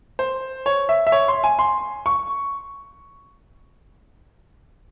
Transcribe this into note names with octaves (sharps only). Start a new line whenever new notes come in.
C5
C#5
E5
E5
C#5
C6
G#5
C6
C#6